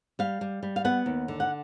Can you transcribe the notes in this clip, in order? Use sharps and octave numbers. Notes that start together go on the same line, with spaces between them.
G3 F5
G3
G3
F5
B3 F#5
D#2
D3
F#5